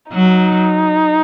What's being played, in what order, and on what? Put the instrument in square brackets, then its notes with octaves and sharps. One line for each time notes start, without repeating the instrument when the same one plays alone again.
[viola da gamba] F#3 [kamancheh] D#4